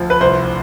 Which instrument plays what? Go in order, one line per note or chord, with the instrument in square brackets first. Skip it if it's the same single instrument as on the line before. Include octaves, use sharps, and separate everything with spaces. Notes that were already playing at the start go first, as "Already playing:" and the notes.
Already playing: [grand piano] D2 F3
B4
C2 C5